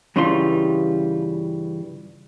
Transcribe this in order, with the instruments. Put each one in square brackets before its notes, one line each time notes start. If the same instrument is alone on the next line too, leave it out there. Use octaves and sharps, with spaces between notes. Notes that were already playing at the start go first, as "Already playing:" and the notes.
[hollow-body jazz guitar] G2 C#3 E3 G3 F4 C6